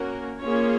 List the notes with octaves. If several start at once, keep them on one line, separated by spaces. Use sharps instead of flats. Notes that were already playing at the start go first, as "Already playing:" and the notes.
Already playing: A#3 C#4 F#4 A#4
A#3 C#4 F4 G#4 C#5